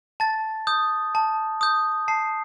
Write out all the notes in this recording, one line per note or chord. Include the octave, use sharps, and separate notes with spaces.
A5 A6
D#6 G6
A5
D#6 G6
A5 C7